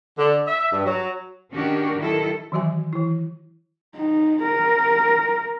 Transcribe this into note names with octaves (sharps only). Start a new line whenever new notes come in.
D3
E5
G2
F#3
D#3 C#4 D4 F#4 G4 A#4
D#3 F#3 E4 A4
D#3 E3 F#3 F#4 E5 G#5
E3 E4
D#4
A#4